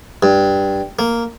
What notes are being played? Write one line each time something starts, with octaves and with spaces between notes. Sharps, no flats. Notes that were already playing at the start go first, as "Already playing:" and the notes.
G2
A#3